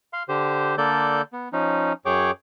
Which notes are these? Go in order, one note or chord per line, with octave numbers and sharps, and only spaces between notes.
F5 C6
D3 G4 C5
D3 A#3 A4 D5 G6
B3
F3 C#4 D#4
F#2 G#4 C#5 G5 D6